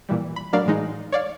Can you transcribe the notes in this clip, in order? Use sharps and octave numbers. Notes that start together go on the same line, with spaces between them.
A#2 E3 G3
B5
F#3 A3 D4 A#4 D5 F5
A2 E3 G#3 D#4
C#5 D5 F5